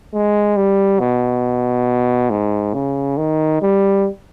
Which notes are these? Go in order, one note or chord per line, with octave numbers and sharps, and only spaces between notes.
G#3
G3
B2
G#2
C#3
D#3
G3